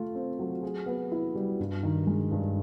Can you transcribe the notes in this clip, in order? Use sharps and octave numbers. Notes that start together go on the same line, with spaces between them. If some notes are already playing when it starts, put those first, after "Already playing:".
Already playing: A3 F4
C4
F#3
G#4
B3
E4
G3
G2
D#3
G#3
G2